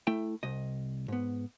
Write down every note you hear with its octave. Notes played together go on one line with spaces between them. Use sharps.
A3 E4 G5
C2 D#5
G#2 B3